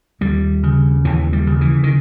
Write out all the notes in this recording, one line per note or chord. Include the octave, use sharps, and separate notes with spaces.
D#2 G3
C#3
D#2 E3
G3
C#3
E3
D#3